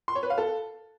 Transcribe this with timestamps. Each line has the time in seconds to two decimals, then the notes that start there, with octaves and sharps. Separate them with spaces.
0.08 C6
0.15 C#5
0.23 B4
0.30 F5
0.38 A4